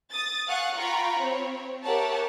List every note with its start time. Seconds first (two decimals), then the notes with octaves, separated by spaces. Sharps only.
0.12 D#6 A6
0.47 F5 F#5 G#5 C#6 F#6
0.78 F4 G5 A#5 B5 C#6
1.18 C4 C#5
1.82 G4 A#4 C#5 E5 F#5 A5